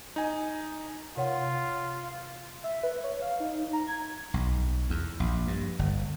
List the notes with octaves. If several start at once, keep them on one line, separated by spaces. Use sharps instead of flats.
D#4 G#5
C3 F4 C#5 F#5
E5
B4
C#5
F5
D#4
A#5
G#6
B1
E2
A#1
G2
G1